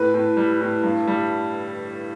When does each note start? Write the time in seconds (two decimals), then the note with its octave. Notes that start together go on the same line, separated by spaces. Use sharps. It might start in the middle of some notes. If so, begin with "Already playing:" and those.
Already playing: A2 B4
0.14 A2
0.37 G3
0.61 A2
0.84 G2
1.07 G3